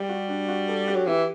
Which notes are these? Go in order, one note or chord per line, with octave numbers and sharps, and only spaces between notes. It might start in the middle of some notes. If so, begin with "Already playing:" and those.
Already playing: G3 G4
F#4
D4
F#4
A4
G4
F#3
E3 G4